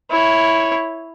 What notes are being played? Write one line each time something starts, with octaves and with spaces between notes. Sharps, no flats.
E4 C#5